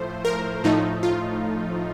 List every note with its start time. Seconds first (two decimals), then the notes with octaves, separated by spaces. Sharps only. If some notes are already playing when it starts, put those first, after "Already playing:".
Already playing: A2 F3 A3 C5
0.25 A#4
0.64 A2 F3 A3 D#4
1.03 F4